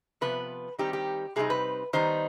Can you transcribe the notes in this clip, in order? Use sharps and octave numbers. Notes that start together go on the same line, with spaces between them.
C3 F3 B3 B4
D#3 G3 C4 D#4 G4
G4
C3 G3 C4 D#4 G#4
B4
D#3 G3 B3 D#4 C5